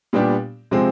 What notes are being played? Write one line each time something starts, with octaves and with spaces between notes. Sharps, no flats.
A#2 G3 B3 D4 G4
C3 F3 G#3 C4